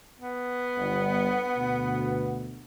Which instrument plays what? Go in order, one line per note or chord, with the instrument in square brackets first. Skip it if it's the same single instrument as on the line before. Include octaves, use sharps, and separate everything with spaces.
[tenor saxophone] B3
[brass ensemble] G1
D2 B2